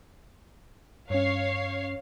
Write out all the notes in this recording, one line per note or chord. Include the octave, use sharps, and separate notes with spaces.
G2 C#4 C#5 F5 C7